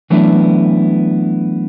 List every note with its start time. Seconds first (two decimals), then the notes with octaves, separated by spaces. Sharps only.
0.10 E3 F#3 A3 B3 D4 E4